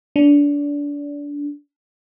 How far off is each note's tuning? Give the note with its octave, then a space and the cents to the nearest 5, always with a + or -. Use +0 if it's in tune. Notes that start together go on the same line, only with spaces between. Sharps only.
D4 -25